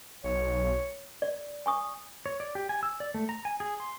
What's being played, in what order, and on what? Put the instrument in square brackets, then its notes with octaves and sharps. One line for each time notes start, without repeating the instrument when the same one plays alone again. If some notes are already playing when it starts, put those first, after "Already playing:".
[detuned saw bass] B1 [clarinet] C#5
[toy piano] D5
G#5 C#6 D#6
[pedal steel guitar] C#5
D5
G4
G#5
E6
D5
A3
A#5
G#5
G#4
C6